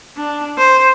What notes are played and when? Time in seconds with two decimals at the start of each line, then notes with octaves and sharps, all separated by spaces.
0.17 D4
0.58 C5